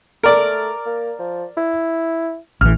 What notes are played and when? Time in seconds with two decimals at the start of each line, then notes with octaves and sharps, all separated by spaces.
0.23 A3 A#4 D5
0.86 A#3
1.19 F3
1.57 E4
2.61 A1 E3 F6